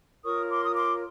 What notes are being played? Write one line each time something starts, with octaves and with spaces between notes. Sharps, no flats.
F4 A#4 C#5 C#6 D#6
C6 D6
D#6
C6 D6